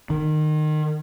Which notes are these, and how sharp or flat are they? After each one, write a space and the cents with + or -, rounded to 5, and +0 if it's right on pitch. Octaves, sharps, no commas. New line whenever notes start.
D#3 -25